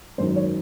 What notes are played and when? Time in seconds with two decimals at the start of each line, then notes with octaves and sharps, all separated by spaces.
0.18 G#1 F#2 D#3 F#3 C5
0.36 C#5